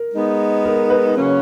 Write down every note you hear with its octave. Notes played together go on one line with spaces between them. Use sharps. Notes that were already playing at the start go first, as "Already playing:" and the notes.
Already playing: A#4
G#3 B3 D#4
A#4
B4
C#3 F#3 A#3 C#4